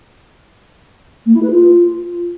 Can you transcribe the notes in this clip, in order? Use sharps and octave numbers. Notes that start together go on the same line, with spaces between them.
A#3
E4
B4
F4